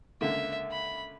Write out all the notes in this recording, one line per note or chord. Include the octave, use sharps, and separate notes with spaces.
C#2 D3 A#3 E5
B5